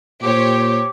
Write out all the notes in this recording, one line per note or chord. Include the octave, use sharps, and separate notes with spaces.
A#2 G4 C5 C#5 D6